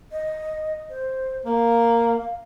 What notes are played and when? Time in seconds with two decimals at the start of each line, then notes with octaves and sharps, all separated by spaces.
0.12 D#5
0.90 C5
1.45 A#3 F5